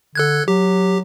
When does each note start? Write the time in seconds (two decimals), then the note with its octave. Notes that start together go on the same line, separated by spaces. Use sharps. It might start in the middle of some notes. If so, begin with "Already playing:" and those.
0.15 D3 A4 F#6 G#6
0.48 F#3 G4